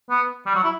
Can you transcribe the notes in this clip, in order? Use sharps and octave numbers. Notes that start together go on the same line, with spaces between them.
B3
G3
F#3
E4